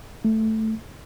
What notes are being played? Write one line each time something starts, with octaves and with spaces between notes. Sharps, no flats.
A3